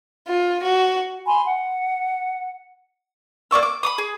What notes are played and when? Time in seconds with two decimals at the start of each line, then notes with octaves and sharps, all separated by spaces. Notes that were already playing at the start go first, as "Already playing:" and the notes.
0.28 F4
0.62 F#4
1.26 G#5 B5 C6
1.47 F#5
3.51 A#3 D5 C#6 E6
3.63 D6
3.83 B5 D6 D#6
3.98 G#4